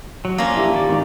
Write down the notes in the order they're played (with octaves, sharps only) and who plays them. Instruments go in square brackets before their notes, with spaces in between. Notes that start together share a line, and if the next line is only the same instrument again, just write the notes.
[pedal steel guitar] F#3
[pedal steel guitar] F3 D4 [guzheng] A#3 C#4
[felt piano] E4 G4 E5
[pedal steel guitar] D#3 D5
[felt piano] G#1